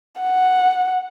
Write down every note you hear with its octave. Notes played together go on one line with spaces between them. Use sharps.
F#5